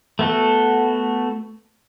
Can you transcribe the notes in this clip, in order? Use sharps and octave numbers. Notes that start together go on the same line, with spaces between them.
A3 B3 F#4 A4